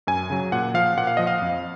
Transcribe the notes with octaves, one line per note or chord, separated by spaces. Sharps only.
F#2 G#5
C#3 F#3
A#2 F#5
F3 F5
A#2 F#5
F5
F3 D#5
F5
F2